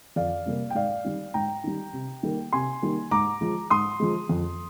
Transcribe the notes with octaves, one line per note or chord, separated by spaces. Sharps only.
F2 D5 F5
C3 G3 A#3
G5
G#2 D5 F5
D#3 G3
G#2 G5 A#5
D#3 G3
C3
D#3 G3 A#3
C3 G#5 C6
D#3 G3 A#3
G#2 A#5 D6
F3 G#3
G#2 C6 D#6
F3 G#3
F2